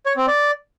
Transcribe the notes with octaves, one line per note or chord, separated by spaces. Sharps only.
C#5
C4
D5